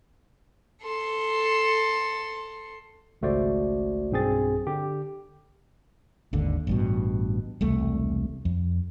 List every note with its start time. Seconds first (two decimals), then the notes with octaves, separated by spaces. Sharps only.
0.82 A4 C6
3.22 G#1 C#2 A3 F#4 C5 D5
4.11 B1 G2 C4 G#4 A6
4.67 D3 G4
6.33 G#1 D#2 D3
6.67 A1 G2 B2
7.61 E1 C2 A3
8.45 F2